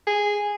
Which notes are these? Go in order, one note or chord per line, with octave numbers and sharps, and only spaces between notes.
G#4